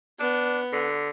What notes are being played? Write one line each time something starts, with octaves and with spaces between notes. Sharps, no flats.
B3 D4
D3